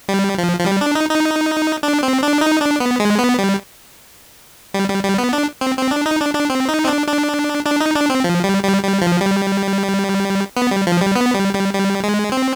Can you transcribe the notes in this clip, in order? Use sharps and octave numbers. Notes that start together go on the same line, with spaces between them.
G3
F3
F3
G3
D4
D#4
D#4
D4
C4
D4
D#4
D4
B3
G#3
B3
G3
G3
G3
G3
B3
D4
C4
C4
D4
D#4
D4
D4
C4
D#4
C4
D4
D4
D4
D#4
D4
C4
F3
G3
G3
G3
F3
G3
B3
G3
F3
G3
B3
G3
G3
G3
G#3
C4